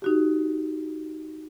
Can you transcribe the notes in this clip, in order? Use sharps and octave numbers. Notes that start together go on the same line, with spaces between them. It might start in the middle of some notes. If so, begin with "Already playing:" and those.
D#4 F#4 G4